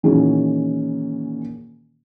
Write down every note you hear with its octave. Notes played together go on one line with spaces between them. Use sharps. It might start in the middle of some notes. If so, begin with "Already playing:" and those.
A#2 D#3 E3 C#4 F#4 G#4